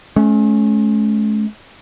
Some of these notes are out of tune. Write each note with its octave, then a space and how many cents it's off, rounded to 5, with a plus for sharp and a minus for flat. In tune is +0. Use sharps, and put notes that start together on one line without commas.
A3 -45 C#4 +0